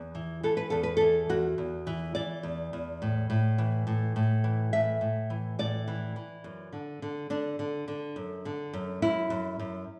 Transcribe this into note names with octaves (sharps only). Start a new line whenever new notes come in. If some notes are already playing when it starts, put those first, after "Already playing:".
Already playing: E2
E3
E3 A4
B4
E2 A4
B4
E3 A4
E2 F#4
E2
E3
E3 D5
E2
E2
A2
A2
E3
A2
A2
E3
A2 E5
A2
E3
A2 D5
E3
E3
F#2
D3
D3
D3 D4
D3
D3
F#2
D3
F#2
F#2 E4
F#2
F#2